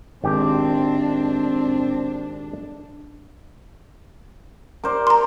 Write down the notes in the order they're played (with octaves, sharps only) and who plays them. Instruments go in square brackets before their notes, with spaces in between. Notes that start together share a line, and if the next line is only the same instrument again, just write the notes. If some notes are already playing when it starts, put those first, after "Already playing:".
[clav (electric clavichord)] G#1 G4 [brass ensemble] C4 [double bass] D4
[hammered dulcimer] A#4 C5 D5
[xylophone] A#5 C6